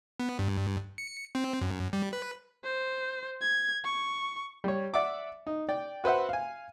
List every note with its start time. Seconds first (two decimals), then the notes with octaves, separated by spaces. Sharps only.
0.20 B3
0.39 G2
0.98 C#7
1.35 C4
1.61 F#2
1.93 G3
2.13 B4
2.64 C5
3.41 G#6
3.84 C#6
4.64 G3 C#5
4.94 D5 E5 F#5 D6
5.47 D#4
5.69 D5 G5
6.04 F#4 B4 C5 E5 F#5
6.29 F5 G#5